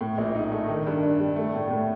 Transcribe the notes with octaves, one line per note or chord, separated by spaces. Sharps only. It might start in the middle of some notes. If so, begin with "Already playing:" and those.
A2
A#1
D#4
A3
D#3
G2
D4
G3
A3
A2
A2